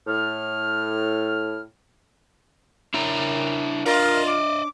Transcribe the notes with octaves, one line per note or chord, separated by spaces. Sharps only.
A2 F6
D4 E4 A#4 C#5 A#5
F4 A#4 D5 D#5
D6